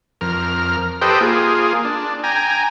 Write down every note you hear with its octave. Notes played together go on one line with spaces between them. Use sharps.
F2 A#4 F6
G4 A4 B4 C5 D#5 G5
A#3 F4 G#4
D4
G5 G#5 A#5